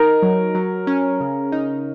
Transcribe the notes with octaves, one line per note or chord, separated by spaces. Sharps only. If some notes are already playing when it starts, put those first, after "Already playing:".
Already playing: D#4 A#4
F#3
F#3
C#4
C#3
D#4